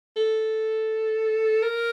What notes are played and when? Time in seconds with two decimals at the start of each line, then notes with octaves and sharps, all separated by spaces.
0.16 A4
1.62 A#4